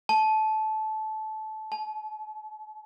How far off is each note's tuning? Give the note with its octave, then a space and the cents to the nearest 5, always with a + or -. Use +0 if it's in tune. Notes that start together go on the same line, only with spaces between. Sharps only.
A5 -20
A5 -45